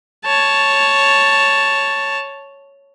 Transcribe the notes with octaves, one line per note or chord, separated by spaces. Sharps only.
C#5 A5